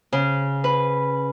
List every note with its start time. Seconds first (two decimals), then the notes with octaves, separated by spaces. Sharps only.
0.12 C#3
0.64 B4